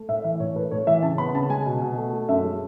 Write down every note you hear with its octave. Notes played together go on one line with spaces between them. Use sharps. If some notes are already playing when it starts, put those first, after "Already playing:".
Already playing: A3
A2 E5
E3 E5
A2 C#5
A3 B4
A2 C#5
E3 E5
C#3 A5
B3 B5
C#3 A5
G#3 G#5
B2
B2
A3
A3
F#2 E5
G#3